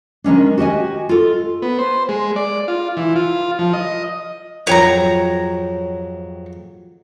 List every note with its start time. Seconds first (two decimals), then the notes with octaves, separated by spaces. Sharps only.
0.24 D#3 G#3 C#4 D4
0.58 F#4 G4 D#5 G#5
1.09 F4 A4
1.62 B3
1.79 C5
2.09 G#3
2.36 D5
2.68 F4
2.97 E3
3.16 F4
3.59 F3
3.73 D#5
4.67 F2 G#2 F#3 C#5 G5 A#5